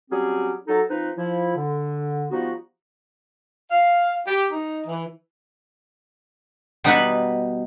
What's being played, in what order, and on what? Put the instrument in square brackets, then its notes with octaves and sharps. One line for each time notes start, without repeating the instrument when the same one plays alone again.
[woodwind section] F#3 G3 C4 C#4 G4 G#4
F#3 D#4 A4
F3 C4 D#4 B4
F3 E4
D3
F3 G3 B3 D#4 F#4
[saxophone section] F5
G4
D#4
E3
[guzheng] B2 G3 D#4 B4 E5 F#5